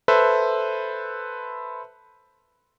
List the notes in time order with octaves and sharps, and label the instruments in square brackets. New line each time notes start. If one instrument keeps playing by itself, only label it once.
[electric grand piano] A4 B4 C5 E5